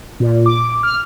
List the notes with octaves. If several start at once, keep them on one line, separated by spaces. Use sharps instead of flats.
A#2
D6
F6